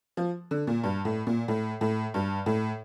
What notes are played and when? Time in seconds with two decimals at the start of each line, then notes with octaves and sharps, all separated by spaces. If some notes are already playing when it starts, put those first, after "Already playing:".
0.17 F3
0.51 D3
0.67 A#2
0.84 G2
1.05 A2
1.27 A#2
1.48 A2
1.81 A2
2.14 G2
2.46 A2